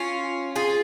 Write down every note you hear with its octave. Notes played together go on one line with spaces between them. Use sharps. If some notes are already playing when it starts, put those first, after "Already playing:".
Already playing: C#4 F4
F4 G#4